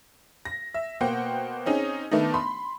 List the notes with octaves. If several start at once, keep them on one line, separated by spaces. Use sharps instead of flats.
A#6
E5
B2 A#3 C5 F#5 G5
C4 C#4 D#4 G#4
D#3 A3 B3 D4 D#4
B5 C6